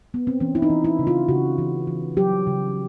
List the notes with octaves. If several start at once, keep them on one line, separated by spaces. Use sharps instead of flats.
B3
C4
E3 C#4
E4
D#4
E3
E4
C#3
F4
C#3 F#4
E3
E3
F#3 G4
C#3